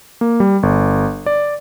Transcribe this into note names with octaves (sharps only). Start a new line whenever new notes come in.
A#3
G3
G1
D5